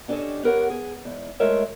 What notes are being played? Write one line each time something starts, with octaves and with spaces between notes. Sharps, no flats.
C#4 D4 G4 A4 C#5 D#5
B3 G4 A#4 C#5 F#5
G#4
E2 G#2
G#3 A3 F4 A#4 C#5 E5